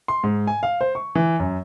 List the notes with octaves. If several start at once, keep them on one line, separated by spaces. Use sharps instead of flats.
C6
G#2
G#5
F5
C5
C#6
E3
F#2